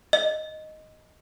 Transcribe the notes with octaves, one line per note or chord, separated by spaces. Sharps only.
D#5